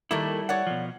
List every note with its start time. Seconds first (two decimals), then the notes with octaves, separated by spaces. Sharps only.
0.11 D#3 G3 A3 A#3 E4
0.49 C#5 D5 F#5
0.67 B2 F3